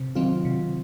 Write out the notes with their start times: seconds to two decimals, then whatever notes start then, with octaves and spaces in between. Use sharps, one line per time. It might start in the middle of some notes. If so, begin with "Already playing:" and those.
Already playing: C3
0.15 D#3 F#3 C4 F4
0.45 C3